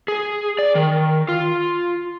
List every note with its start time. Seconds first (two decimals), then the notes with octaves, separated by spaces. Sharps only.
0.08 G#4
0.59 D5
0.75 D#3
1.29 F4